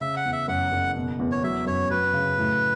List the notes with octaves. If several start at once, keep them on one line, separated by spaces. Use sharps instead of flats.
C#3 E5
F#5
E2
E5
F#2 F#5
F#1
B2
E2
C#5
F#3 E5
F#2 C#5
F#3 B4
C#3
A2